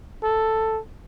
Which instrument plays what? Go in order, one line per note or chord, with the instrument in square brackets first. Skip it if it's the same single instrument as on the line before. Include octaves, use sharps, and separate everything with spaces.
[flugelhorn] A4